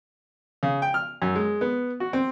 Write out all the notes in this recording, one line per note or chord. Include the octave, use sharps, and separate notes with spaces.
C#3
G5
F6
F#2
G#3
B3
F#4
C4